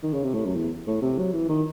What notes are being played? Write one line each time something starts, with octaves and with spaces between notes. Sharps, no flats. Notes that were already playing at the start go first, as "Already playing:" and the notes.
D#3
C#3
C3
A2
F#2
E2
A2
C3
F#3
E3
D#3